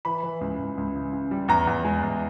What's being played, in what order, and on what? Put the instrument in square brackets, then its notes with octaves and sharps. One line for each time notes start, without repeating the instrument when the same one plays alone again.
[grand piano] E3 B5
E3
C#2
C#2
C#2
C#3
C#3
G3
E2 A#5
E2
G#3
E2